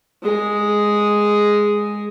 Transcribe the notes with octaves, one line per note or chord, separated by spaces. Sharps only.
G#3 G#4